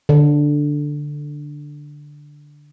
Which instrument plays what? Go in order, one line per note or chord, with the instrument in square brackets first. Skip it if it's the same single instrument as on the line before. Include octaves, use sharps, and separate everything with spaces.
[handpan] D3